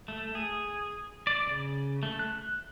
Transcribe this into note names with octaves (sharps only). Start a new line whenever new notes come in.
A3
G#4
D5
C#3
A3
F#6